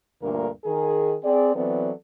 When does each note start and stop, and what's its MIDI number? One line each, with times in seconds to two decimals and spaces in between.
0.21 0.49 38
0.21 0.49 43
0.21 0.49 46
0.21 0.49 50
0.21 0.49 58
0.21 0.49 70
0.65 1.15 51
0.65 1.15 68
0.65 1.15 70
1.24 1.54 60
1.24 1.54 68
1.24 1.54 74
1.54 1.90 52
1.54 1.90 54
1.54 1.90 59
1.54 1.90 60
1.54 1.90 69
1.54 1.90 74